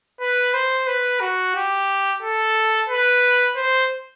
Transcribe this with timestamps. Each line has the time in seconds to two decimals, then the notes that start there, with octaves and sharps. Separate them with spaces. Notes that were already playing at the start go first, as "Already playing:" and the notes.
0.20 B4
0.54 C5
0.87 B4
1.21 F#4
1.55 G4
2.22 A4
2.89 B4
3.56 C5